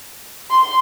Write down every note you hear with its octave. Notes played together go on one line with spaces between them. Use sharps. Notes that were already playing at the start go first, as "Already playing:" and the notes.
C6